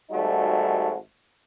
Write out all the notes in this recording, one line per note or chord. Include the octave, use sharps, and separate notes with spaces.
G#1 G3 A3 D#4 F#4